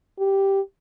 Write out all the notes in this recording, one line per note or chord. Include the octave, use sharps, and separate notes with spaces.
G4